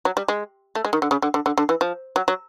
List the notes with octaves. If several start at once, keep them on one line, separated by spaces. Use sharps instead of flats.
F#3
G3
G#3
A3
G#3
D#3
D3
C#3
D3
D3
D3
D3
E3
F3
F#3
F#3